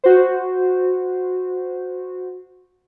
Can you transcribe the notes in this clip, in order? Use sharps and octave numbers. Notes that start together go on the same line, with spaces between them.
F#4 C5